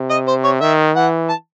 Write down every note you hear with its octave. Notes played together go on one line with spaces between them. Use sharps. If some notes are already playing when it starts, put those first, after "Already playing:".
Already playing: C3
D#5
C5
C#5
D#3 E5
E3 F#5
A5